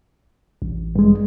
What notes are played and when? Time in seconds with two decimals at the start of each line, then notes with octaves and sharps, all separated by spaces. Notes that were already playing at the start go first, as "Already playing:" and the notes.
0.62 A1
0.95 G2 G#3